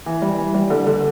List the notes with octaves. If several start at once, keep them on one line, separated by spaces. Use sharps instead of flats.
E3
G3
E3
G3
D3
D3